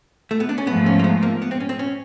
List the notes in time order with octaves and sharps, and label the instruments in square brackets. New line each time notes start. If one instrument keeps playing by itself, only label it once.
[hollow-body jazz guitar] A3
B3
D4
C#4
[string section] G#2 F3 A3 [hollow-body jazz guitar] B3
[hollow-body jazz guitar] C#4
A#3
B3
A#3
B3
C4
C#4
C4
C#4